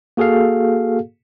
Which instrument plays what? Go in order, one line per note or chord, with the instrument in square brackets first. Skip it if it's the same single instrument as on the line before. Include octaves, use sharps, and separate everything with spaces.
[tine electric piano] A#3 F#4 G#4 A4 F5